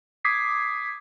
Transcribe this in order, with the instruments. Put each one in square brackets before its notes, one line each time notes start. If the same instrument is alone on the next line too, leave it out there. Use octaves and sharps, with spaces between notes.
[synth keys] D6 D#6 G#6 B6 C7